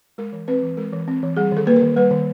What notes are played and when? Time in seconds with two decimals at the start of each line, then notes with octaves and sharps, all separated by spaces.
0.18 G#3 A#4
0.33 E3
0.48 C4 B4
0.63 E3
0.77 G#3 A#4
0.93 E3
1.08 C4
1.23 E3
1.37 G3 G#4
1.52 D#3 A4
1.67 A#3 B4
1.76 A#4
1.82 D#3
1.96 G3 B4
2.11 D#3